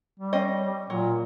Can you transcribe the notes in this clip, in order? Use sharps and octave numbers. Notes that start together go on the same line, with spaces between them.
G3
C4 C#4 D#5
A#2 F#3